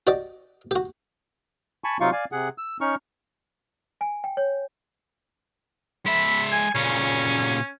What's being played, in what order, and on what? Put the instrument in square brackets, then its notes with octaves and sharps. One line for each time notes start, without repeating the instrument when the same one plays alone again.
[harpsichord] F#4 G4 D5 D#5
F#4 G4
[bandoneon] G#5 A5 B5 C#6
C3 F#3 D#4 F4 F5 C#6
D5 F5 G#5
C3 G#4 F#5
E6
C#4 D#4 C#6 F6
[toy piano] G#5
G5
C#5
[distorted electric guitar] G#3 E5 [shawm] B5
[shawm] G#5
[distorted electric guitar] A#2 C#3 [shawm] C#4